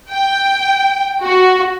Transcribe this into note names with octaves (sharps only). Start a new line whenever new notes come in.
G5
F#4